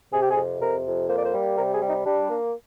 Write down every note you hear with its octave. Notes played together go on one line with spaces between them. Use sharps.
C3 G#4
G4
G#4
F2
C3 A#4
F2
A#3 C5
D5
C5
G3
C3 A#4
G#4
G3
D#4
G3 D4
A#3